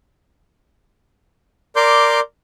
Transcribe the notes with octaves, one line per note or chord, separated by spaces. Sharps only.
A#4 D5 C6 D6 G6